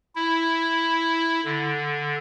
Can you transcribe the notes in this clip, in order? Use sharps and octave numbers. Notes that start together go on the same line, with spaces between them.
E4
D3